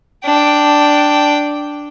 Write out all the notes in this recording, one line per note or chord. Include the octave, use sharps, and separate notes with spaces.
D4 G5